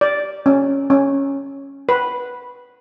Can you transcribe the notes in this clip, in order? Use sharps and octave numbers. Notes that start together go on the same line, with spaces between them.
D5
C#4
C#4
B4